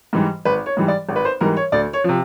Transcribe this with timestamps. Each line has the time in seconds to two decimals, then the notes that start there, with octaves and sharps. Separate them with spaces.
0.13 G#2 E3 G3
0.45 G#1 B4
0.66 C#5
0.77 G#2 E3 G3
0.88 D5
1.09 G#1
1.16 B4
1.25 C5
1.41 G#2 E3 G3 A#4
1.57 C#5
1.72 D2 D5
1.93 C#5
2.04 C3 F3